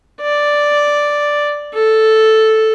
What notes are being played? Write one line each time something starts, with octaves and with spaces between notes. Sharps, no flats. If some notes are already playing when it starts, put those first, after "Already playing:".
D5
A4